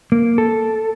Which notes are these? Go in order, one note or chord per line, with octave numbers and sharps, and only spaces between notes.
A#3
A4